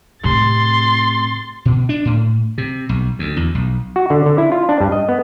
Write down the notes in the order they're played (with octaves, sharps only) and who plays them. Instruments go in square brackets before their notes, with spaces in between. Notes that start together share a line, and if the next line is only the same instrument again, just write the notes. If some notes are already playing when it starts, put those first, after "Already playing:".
[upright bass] A2 C3 [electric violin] C6 A6
[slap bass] B2
D4
A2
C3
B1
D2
E2
B1
[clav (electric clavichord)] F#4
D3
D3
E4
F4
D4
G2
D#5
B3